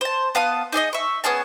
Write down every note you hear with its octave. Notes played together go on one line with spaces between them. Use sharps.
C5 A5
B3 F5 A5 D#6
D#4 G#4 D5 D#5
E5 C#6
B3 C#4 G#4 A5